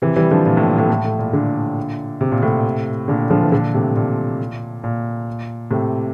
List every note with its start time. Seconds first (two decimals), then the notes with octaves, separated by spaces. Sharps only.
0.02 C3 E3
0.16 E3 G3
0.31 D3 F3
0.46 A#2
0.57 A2
0.68 A#2
0.78 A2
0.90 A2
1.04 A2
1.19 A#2
1.33 A#2 D3
2.21 C3
2.32 A#2
2.42 A2 C3
3.08 A#2 D3
3.30 D3 F3
3.43 E3
3.52 A#2 D3
3.74 A2 C3
3.96 A#2
4.84 A#2
5.71 A2 C3